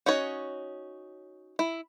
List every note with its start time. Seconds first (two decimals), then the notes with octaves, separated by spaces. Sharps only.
0.06 C#4 D#4 F#4 C#5
1.59 E4